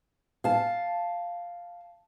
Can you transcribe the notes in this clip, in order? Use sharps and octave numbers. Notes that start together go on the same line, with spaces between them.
F5 A5